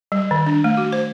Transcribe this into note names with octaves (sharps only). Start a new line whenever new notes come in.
G3
D#3
D4
A3
F#4
C5